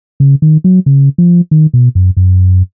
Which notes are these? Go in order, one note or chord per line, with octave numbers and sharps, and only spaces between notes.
C#3
D#3
F#3
C#3
F3
D#3
B2
F#2
F#2